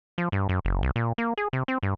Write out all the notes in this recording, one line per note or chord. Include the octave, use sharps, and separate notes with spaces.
F3
G2
F#2
F#1
C2
A#2
A#3
G#4
C3
C4
G2